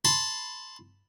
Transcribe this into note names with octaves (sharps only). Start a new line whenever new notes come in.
A5 B5 C6